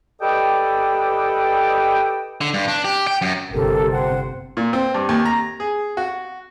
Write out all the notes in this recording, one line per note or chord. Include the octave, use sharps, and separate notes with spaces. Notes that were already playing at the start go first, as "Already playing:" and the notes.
G4 A4 B4 D5 D#5 G5
D3
G2
D4
G4
G5
F#2
G1 C3 G4 A4 A#4
C5 F#5 G5
A#2
C4
G2
D#2
A#5
G#4
F#4